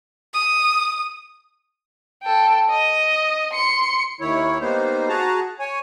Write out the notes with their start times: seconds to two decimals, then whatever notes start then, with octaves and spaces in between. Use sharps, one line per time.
0.34 D#6
2.23 A4 G5
2.70 D#5
3.54 C6 C#7
4.21 D#2 D#3 E4 C#5
4.61 G3 A#3 B3 D#4 C5
5.09 F#4 G#4 A5 A#5
5.59 C#5 G#5